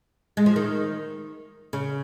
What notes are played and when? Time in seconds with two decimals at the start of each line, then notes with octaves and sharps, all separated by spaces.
0.37 G#3
0.46 F3
0.56 D#3
1.73 C#3